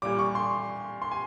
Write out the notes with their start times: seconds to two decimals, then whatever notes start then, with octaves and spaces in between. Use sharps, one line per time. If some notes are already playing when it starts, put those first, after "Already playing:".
0.02 A#2 G3 D6
0.19 C#6
0.35 C6
1.02 C6
1.11 G#5